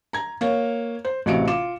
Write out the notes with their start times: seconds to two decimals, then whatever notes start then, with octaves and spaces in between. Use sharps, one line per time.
0.13 A#5 G#6
0.41 A#3 C#5
1.05 C5
1.26 A1 C3 F#4 F5 C#7 D7
1.48 F4 D6 E7